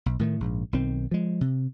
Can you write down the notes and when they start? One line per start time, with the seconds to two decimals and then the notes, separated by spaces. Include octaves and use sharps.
0.06 B1
0.19 A2 D#3 A3
0.40 A#1 G#2
0.73 B1 D#3 C4
1.11 F3 G#3
1.41 C3